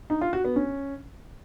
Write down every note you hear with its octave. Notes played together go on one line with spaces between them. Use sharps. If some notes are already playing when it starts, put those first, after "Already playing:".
D#4
F4
F#4
B3
C#4